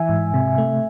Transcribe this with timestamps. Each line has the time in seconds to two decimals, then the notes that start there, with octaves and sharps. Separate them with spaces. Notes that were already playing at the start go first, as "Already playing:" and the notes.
Already playing: E3 E5 G#5
0.09 G#2
0.34 C3
0.58 A3